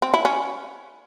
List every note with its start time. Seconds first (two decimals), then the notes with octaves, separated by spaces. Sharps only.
0.02 C4
0.14 E4
0.25 C#4